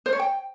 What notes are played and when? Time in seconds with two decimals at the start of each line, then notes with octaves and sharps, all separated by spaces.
0.06 C5
0.13 C#5
0.19 G5